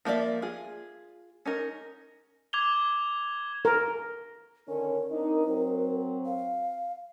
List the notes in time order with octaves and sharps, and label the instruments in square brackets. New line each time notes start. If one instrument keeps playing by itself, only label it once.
[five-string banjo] F3 A#3 F#4 D5 E5
F4 G#4
C#4 D#4 A#4
[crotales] D6 G#6 F7 G7
[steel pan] A#4
[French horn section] D3 D#3 C#4 [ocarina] A#4
[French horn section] C4 D4 D#4
F#3 C4
[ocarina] F5